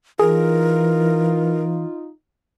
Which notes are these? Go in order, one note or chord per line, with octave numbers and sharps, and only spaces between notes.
E3 D#4 F4 G#4 A#4